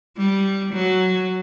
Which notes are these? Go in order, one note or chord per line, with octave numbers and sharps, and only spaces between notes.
G3
F#3